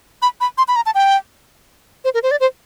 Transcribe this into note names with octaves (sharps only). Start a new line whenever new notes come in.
B5
B5
C6
B5
A#5
A5
G5
C5
A#4
C5
D5
C5